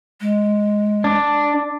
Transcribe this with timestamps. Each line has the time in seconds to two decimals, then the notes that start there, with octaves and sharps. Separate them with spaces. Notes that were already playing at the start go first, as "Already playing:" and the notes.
0.21 G#3
1.04 D4